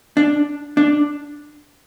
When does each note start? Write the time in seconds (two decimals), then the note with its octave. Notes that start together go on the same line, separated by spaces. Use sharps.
0.17 D4
0.77 D4